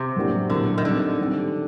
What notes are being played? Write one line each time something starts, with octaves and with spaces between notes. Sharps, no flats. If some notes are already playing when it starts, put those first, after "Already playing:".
Already playing: C3
A2 F#3 A#3 D4 G4
A#2 D3 F#3 A#3
D#3
D3 G3 C4 D#4 G4
D#3 A3 C4 G4